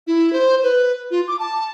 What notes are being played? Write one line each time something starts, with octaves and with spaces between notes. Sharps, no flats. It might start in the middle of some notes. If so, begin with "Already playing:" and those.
E4
C5
B4
F4
D6
A5